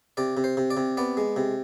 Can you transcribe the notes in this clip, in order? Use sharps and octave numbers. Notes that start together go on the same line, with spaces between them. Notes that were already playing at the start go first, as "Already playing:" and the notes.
C3 D5
C3
C5
C3
D5
C3
B3 D5
G#3
C3